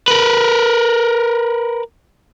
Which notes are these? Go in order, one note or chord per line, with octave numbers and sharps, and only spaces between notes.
A#4 B4